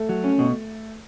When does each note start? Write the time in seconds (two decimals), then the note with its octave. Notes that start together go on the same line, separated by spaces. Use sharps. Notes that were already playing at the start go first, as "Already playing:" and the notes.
Already playing: A3
0.09 F#3
0.24 C#4
0.39 B2